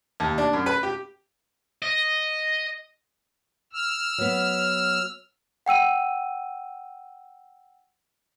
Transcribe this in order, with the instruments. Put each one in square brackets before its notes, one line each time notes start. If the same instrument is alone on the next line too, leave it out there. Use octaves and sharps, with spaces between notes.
[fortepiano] D#2
D4
F#2
B4
G4
[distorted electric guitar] D#5
[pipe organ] E6 F6
[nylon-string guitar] F#3 B3
[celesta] F#5 G5 E6 D#7